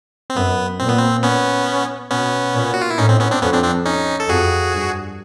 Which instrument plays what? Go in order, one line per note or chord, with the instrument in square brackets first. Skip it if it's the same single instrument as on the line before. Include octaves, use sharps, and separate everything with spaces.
[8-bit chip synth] C4
[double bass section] F#2 [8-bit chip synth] B3
[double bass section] A#2 [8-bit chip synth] C4
[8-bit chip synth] B3
C4
B3 C#4
[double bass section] B2 [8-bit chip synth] B3 C#4
[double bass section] A#2
[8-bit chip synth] F#4
F4
E4
[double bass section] A2 [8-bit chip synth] C#4 D#4
[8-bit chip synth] C4
B3 C#4
C4 D4
[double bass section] F2 [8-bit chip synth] B3 C#4
[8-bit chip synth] C4 D4
C4 D4
C#4 D#4
A4
[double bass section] F2 [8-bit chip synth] F#4 G#4
[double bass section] G2